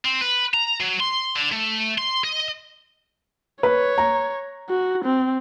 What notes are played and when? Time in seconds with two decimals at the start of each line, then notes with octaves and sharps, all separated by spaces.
0.05 C4
0.21 B4
0.54 A#5
0.80 F#3
1.00 C6
1.36 D3
1.52 A3
1.98 C6
2.24 D#5
3.63 B4 C#5
3.98 A#5
4.69 F#4
5.05 C4